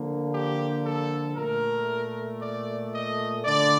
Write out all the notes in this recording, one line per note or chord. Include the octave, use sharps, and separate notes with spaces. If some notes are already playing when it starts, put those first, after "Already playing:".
Already playing: D3 F3 A#3
G4
A4
A#2 A3 A#4
D5
D#5
D3 A3 D5